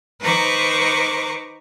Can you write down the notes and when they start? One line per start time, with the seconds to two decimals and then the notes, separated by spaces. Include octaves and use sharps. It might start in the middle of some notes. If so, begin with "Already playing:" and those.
0.21 D#3 B4 C5 A#5 C#6 D6